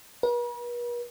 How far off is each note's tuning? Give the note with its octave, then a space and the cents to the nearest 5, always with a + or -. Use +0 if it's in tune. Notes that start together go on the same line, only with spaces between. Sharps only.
B4 -45